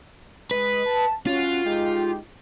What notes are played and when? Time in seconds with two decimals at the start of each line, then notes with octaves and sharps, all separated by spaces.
0.51 G#3 B4 D#5
0.86 A5
1.27 C#4 F4 F#4
1.65 G#3 D#4 G4